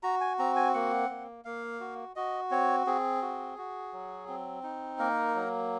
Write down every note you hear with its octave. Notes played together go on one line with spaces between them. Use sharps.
F#4 A#5
G#5
C4 A#5
G#5
A#3 F#5
A#3
A#3 F5
F#4
F#4 D#5
C4 C#5
C4 G#4
F#4
F#4
F#3
C4
D#4
A#3 A#4
F#3